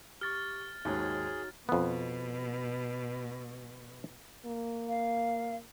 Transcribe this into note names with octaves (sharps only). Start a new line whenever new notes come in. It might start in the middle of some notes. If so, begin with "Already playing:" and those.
G4 C#6 F6 A6
D#2 G#2 D#4 F#4 G#4 C#5
F2 B2 B3
A#3
F5